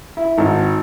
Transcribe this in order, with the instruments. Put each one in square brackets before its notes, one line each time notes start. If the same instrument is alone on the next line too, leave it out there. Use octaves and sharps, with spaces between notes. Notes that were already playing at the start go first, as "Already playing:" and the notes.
[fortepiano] E4
G#1